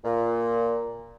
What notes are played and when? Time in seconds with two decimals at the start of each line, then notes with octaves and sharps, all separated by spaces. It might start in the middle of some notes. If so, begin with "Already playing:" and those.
0.04 A#2